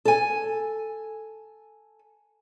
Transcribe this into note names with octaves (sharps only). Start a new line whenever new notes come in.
A4 G#5